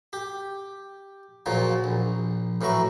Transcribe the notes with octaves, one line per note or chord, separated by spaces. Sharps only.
G4
A#2 C#3 F3 F#3
A#1
A2 E3 F#3 E4 A#5 C#6